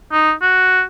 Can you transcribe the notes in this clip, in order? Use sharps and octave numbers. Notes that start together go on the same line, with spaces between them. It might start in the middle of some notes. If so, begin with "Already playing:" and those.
D#4
F#4